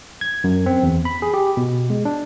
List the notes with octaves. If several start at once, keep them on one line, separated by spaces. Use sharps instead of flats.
G#6
F#2
C4
E2
B5
G#4
G4
B2
G#3
D4